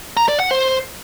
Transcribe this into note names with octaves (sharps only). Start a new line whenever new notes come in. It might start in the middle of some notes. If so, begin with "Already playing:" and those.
A#5
D5
F#5
C5